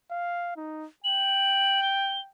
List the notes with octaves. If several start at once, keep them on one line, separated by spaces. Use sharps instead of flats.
F5
D#4
G5 F#7
G7